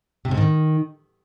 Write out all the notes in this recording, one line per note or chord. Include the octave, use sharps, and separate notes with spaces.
C3
G#2
D#3